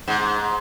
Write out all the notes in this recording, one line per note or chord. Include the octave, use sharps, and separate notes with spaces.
G#2